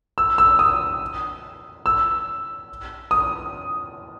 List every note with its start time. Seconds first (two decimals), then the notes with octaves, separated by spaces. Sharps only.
0.18 E6
0.38 E6
0.59 D#6
1.86 E6
3.11 D#6